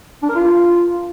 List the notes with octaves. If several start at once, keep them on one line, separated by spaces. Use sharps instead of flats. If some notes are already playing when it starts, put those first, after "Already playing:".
D4
A#4
F4